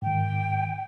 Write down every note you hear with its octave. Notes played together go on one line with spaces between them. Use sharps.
G#2 D#3 G5